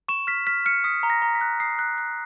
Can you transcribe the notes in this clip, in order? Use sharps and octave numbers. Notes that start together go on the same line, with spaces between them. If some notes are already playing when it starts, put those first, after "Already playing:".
C#6 E7
F6 B6
F6 B6
F6 C#7
D#6 B6
A#5
A#6
A#5
B6
F#6
D#6 C7
F#6
F#6